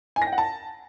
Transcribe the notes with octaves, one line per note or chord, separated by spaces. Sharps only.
G#5
A#6
G5
F#5
A5